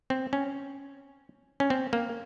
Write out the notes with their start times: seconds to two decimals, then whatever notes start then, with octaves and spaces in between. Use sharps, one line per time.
0.10 C4
0.33 C#4
1.60 C#4
1.70 C4
1.93 A#3